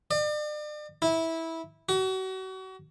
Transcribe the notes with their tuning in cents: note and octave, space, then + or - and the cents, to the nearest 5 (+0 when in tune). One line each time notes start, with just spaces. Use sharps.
D5 +40
E4 -15
F#4 +35